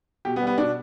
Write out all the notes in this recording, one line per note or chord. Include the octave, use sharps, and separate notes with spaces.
B2 G4
B3
G3
B3
B2 D4